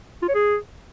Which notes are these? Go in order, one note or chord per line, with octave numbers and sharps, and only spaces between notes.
F4
C#5
G#4